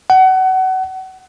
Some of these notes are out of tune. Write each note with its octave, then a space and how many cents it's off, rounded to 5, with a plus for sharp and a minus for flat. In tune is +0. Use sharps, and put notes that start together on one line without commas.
F#5 +25